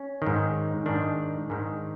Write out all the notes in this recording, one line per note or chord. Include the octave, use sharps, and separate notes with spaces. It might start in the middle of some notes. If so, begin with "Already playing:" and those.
Already playing: C#4
G#2 D#3
G#2 D#3 D4
G#2 D#3